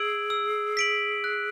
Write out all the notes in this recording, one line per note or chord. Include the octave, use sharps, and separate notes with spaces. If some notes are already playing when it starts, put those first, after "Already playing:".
Already playing: G#4 E6 G#6 D7 F#7
E6
B6 D7 F#7
F#6